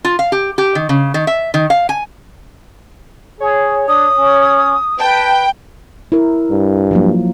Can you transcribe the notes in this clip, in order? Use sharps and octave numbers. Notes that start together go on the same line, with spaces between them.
F4
F5
G4
G4
D#3
C#3
D#3
E5
D#3
F5
G#5
G#4 C#5
D4 D#6
C#4
B4 G5 A5
E4 A#4
G2
F3 F#3 A#3